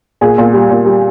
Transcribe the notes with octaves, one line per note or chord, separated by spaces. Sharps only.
A#2 G#4
A#2
G3
A#2
G3